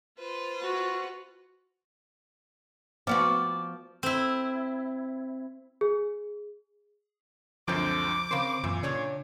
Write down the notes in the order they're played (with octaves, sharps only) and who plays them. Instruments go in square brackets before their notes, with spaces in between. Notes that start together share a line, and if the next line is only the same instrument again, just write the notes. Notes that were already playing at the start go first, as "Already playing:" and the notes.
[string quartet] F4 B4 C5
[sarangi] F#4
[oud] F3 B3 F#4 [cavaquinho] D5
[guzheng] C4 E4
[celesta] G#4
[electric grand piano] C#2 F#2 G6 [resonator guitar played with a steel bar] D3 C4 [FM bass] F3 [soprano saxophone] D6
[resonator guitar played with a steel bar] C#3 A#4 C5 [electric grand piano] C4
[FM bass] F#2 [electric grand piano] A#2 [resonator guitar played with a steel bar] E3
[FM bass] C#3 [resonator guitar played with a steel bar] D4 C#5 D5